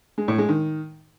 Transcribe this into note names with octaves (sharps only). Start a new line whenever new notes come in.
G#3
A2
G#3
D#3